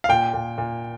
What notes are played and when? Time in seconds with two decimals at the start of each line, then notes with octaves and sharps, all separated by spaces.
0.04 F5
0.09 A#2 G5
0.34 A#2
0.58 A#2